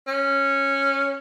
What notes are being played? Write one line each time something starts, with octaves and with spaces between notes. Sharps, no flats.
C#4